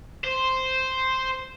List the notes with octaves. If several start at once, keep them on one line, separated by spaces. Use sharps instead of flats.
C5